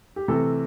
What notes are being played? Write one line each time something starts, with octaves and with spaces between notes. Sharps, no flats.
G4
C3 E3 A3 A4